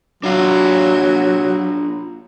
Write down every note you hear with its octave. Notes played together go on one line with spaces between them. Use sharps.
F#3 D4 F4 F5